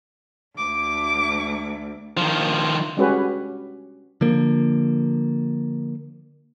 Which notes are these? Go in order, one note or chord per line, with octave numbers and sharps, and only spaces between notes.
D2 D6
D#3 F3
G3 G#3 C#4 F#4 G4 B4
D3 F3 A#3